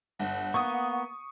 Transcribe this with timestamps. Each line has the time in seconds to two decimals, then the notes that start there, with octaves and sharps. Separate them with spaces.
0.19 G1 F#5
0.54 A#3 B3 C#6 D#6